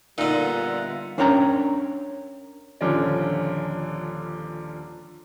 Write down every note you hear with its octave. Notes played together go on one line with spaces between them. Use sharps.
A#2 D3 G3 B3 D#4 F4 E5 F#5
C#4 D4 A#4 C#5 G5 A#5
D#1 D3 F3 C#4 D4